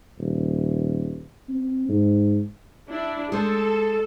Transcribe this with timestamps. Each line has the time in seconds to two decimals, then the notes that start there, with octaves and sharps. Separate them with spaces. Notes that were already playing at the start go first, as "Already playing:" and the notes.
0.19 D#1
1.49 C4
1.89 G#2
2.88 D4 E4
3.32 G#3 A4 C5